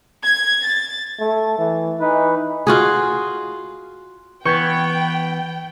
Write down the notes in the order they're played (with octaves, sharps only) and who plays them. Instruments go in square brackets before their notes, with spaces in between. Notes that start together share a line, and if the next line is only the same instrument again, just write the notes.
[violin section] G#6
A6
[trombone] A3
E3
[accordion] E3 B4 [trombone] D#4
[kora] F4 F#4 G#4
[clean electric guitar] E3 B3 [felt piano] B4 [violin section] G5 [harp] C#6 G6 G#6